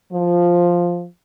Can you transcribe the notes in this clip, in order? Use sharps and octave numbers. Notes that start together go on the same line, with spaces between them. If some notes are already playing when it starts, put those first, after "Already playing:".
F3